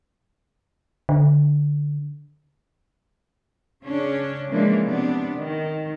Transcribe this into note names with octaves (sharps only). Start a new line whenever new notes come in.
D3
C#3 C#4 D4
C#3 E3 F3 G#3 A#3 D4
C3 B3 D4
D#3